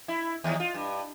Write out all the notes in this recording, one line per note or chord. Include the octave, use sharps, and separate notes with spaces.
E4
D#2
F4
G2